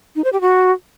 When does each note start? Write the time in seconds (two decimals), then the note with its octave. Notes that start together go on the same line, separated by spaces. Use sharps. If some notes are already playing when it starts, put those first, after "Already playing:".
0.16 D#4
0.24 C5
0.33 G4
0.41 F#4